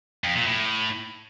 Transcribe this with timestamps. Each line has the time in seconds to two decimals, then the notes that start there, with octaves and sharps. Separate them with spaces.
0.24 F2
0.35 A#2
0.47 A2